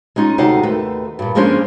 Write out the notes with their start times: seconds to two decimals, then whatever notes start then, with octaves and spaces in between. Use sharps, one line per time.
0.16 G#3 C#4 D#4 F4
0.38 D2 C3 D#4 F5 F#5
0.63 D#2 A3 B4
1.19 G2 A#2
1.35 F3 G#3 A#3 C#4 D4 C5